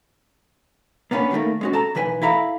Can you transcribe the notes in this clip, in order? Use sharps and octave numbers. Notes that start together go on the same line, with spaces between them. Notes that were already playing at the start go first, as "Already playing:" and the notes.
A#3 B3 C#4 D4 B4
D#3 F#3 G3 A3 A#3
G#3 C#4 F#4
A4 A5 A#5
B1 E3 B4 G#5
E4 A4 E5 F5 A#5 B5